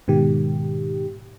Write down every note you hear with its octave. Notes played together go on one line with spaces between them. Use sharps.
G#2 B2 D#3 G4